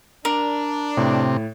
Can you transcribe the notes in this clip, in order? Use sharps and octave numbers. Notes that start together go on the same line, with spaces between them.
D4 A#4
A2 C3